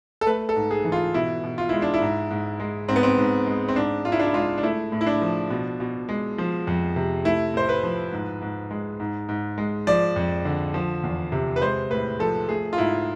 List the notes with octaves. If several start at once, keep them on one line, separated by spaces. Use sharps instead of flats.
A4
A3 B4
A4
G#2
G#4
E3
F4
B2 E4
B2
F4
G#3 E4
D4
E4
G#2
G#2
G#3
G#2 C4
B3
C4
G#2
G#3
C4
G#2 D4
G#2 F4
E4
D4
E4
G#3 F4
D4
A3 E4
A2
E4
D4
F3
B2
B2
G#3
F3
F2
C3
A3 E4
A2 C5
B4
F3
G#2
G#2
G#3
G#2
G#2
G#3
F3 D5
F2
D3
F3
E2
C3
B4
G#3 C5
A2 B4
F3 A4
A3 G#4
F4
G#2 E4